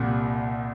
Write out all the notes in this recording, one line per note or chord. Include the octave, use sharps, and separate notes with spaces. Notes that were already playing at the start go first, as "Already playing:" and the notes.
Already playing: C2 A#2 F#5